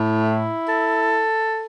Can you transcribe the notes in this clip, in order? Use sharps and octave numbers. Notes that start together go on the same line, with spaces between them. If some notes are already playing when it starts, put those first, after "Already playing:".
Already playing: A2
E4
A4